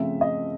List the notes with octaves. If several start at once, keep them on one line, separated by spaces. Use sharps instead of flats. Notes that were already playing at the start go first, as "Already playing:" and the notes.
Already playing: C#3 F3 A3 C4 E5
D#5